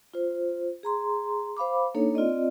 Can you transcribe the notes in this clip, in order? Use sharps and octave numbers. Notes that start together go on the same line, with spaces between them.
F4 C5
G#4 A#5 C6
C5 F5 B5 D6
A#3 D4 D#4 A4 C#5
C4 F4 D5 D#5